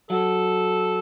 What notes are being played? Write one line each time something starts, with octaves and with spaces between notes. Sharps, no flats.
F#3 A4